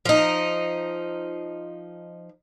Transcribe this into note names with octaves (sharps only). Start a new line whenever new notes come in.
F3 D#4